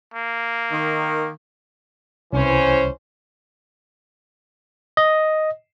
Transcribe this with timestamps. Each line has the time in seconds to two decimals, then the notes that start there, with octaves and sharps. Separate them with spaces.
0.14 A#3
0.71 D#3
2.33 C2 E3 C#4 C5
4.97 D#5